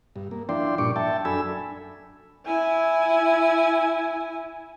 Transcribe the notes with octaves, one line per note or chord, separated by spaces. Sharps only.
G2
A#3
F3 D4 E4 D5 G5 C6
G2 A#2 D4 C#6 D6
E5 G5 A5
F#2 D4 A4 G#5 B5 E6
E4 G#5